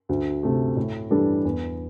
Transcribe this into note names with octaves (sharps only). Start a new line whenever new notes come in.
D2
C3 A3
A2
E3 G3 D4 A4
E2